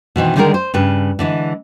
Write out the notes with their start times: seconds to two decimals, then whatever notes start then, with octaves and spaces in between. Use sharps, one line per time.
0.16 B2 D#3 E3 C4
0.36 D3 D#3 G3 G#3 G#4 A#4
0.54 C5
0.74 G2 C#3 B4
1.19 D3 E3 G#3